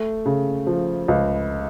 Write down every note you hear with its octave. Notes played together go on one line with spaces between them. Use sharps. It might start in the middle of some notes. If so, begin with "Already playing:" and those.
Already playing: A3
C#3
F3
C#2